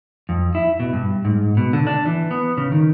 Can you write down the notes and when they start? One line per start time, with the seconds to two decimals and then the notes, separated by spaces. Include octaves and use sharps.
0.29 F2
0.55 E4
0.80 B2
0.93 G2
1.25 G#2
1.57 B2
1.73 D3
1.87 D4
2.06 E3
2.31 B3
2.57 C#3
2.72 D#3